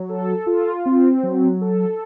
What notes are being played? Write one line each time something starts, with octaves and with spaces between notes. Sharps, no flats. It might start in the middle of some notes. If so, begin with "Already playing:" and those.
Already playing: F#3
A4
F4
C4
F#3
A4